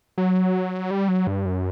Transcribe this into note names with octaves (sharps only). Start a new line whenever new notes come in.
F#3
G3
F#3
G2
F#2